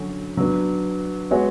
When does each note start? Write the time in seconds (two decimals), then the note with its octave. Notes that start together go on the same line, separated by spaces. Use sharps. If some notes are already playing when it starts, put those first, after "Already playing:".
Already playing: D3 F#3 C#4 F#4
0.37 F#3 B3 D4
1.31 G#3 B3 F#4 C#5